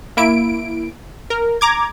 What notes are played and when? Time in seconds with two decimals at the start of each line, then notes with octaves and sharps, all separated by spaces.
0.17 A#3 E4 D7
1.30 A#4
1.61 A#5 D6 G#6